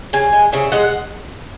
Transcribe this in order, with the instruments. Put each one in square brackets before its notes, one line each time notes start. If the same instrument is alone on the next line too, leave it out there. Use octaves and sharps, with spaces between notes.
[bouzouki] C#3 G#5
G#3
C#3 E5
G#3 F#5